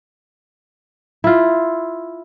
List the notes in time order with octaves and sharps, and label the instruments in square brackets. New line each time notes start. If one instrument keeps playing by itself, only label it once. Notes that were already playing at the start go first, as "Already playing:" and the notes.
[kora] E4 F4